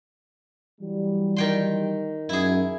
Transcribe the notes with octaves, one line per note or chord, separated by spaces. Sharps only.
E3 F#3 G3
D#3 G5 C6
F#2 E4 G#4